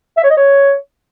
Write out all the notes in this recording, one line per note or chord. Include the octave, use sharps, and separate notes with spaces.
E5
C#5
D#5
C#5